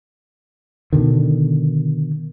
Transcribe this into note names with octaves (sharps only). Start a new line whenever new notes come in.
B2 D3 D#3